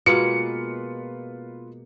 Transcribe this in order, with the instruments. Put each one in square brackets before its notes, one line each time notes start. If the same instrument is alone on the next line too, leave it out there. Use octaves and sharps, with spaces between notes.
[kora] B2 G#3 A#3 [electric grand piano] F4 B4 [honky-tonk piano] C#7